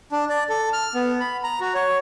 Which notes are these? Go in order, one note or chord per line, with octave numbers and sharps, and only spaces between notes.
D4
D5
A4
F6
B3
B5
A#5
F#4
C#5